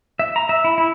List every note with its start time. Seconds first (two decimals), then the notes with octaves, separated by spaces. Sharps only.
0.19 E5
0.36 A#5
0.49 E5
0.64 E4
0.78 E4